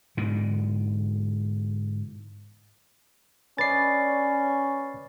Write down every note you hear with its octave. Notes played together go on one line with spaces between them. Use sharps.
G#2 B2 D3 E3
C#4 B4 D5 D#5 A6 C7